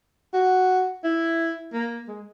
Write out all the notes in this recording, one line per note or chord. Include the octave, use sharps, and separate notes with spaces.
F#4
E4
A#3
G#3